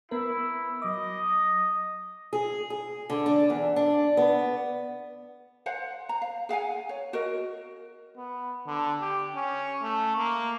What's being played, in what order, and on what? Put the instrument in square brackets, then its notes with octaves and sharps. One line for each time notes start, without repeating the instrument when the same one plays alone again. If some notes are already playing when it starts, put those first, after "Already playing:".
[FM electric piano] B3 A#4 [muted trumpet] E4
[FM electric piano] F#3 D6 [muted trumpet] D#5
[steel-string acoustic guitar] G#4
G#4
D3
D4
E2
D4
B3
[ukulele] C5 F5 F#5
A#5
F5
G#4 F5 F#5 G#5
C#5
F#4 A#4 D#5
[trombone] B3
D3
G4
C#4
A3
A#3